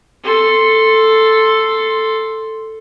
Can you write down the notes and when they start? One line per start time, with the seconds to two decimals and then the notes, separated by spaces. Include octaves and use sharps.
0.24 A4 C6